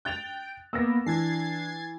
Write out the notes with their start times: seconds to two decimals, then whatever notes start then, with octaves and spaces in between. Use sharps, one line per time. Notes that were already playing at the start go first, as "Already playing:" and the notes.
0.05 G5 F#6 A6 F7
0.73 A#3 B3 E6 A#6
1.06 E3 D4 G#6 A6 C7